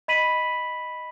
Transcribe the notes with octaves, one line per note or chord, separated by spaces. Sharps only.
D#5 B5 B6 D#7 F#7